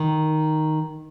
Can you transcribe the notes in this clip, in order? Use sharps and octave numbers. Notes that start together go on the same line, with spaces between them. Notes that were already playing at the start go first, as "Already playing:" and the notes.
Already playing: D#3